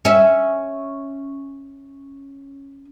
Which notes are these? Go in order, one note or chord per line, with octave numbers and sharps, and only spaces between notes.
C#4 E5